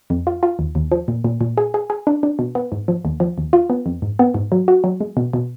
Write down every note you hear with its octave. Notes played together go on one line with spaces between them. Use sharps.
F2
F4
F4
D#2
D#2
F3
A#2
A#2
A#2
G#4
G#4
G#4
D4
D4
B2
B3
G#2
F3
D#2
F3
D#2
F4
B3
F2
G#2
B3
G#2
F#3
F#4
F#3
G#3
B2
B2